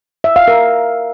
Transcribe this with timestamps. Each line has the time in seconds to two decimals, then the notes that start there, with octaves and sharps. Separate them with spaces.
0.24 E5
0.36 F5
0.48 A#4